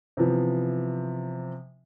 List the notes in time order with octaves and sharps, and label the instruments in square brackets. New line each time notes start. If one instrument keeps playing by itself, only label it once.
[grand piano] C3 E3 F3 B3